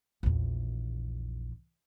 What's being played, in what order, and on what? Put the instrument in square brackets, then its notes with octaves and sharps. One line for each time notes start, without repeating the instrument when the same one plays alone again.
[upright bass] A#1 E2